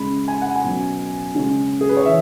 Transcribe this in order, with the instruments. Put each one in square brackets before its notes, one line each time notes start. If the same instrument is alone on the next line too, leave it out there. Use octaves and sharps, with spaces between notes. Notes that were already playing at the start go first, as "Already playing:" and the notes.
Already playing: [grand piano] C#3 G#3 C#4 B5
G#5
F#5
G#5
B2 F#3 C#4
C#3 G#3 C#4
G#4
B4
C#5
E3 E5